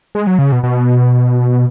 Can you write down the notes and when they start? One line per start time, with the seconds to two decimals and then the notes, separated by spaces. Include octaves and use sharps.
0.15 G#3
0.27 F#3
0.39 C#3
0.52 B2
0.63 B2